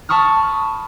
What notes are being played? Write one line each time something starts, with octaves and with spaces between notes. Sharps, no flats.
A5 B5 C#6 D#6 F6